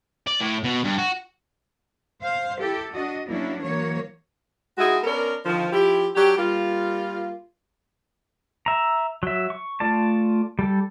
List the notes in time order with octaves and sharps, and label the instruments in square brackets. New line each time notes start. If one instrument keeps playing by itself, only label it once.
[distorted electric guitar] D5
A2
B2
G2
F#4
[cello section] C5 F5
E4 G4 A4
D4 F#4 D#5
F#3 A#3 C#4 D4 E4
E3 F#3 A#3 C#5
[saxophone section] G#3 D#4 E4 F#4 G#4
B3 C#4 D4 A#4
D3 D#3 F3
F3 E4 G4
F#3 D4 G4
G3 A#3 F4
[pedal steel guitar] E5 A#5
F#3 E5
C#6
A3 F4 D5 A5
G3 A4